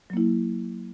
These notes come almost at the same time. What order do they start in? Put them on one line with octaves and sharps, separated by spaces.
F#3 A#3 E4